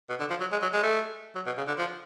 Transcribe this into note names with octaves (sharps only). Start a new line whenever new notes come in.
B2
D3
F3
F#3
G#3
F#3
G#3
A3
F#3
B2
C#3
D3
F3